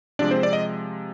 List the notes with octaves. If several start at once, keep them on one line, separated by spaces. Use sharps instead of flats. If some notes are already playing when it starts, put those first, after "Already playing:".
C3 F3 G#3 D4 D5
C4 C5
D5
D#5